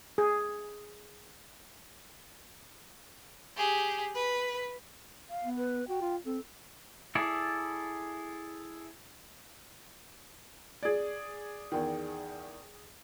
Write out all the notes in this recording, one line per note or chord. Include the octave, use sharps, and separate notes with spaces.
G#4
G4 G#4
B4
F5
B3
B4
F#4 G5
F4
C4 A4
E4 G#4 A4 D5
G#4 D5
E2 D#3